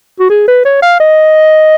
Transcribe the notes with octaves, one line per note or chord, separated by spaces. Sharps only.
F#4
G#4
B4
C#5
F5
D#5